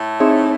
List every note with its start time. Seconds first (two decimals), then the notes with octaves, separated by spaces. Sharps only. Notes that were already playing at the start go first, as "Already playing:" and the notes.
Already playing: A2 A3
0.20 C4 D#4 G#4 C#5 E5